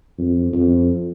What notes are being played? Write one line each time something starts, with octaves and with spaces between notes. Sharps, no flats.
F2
F2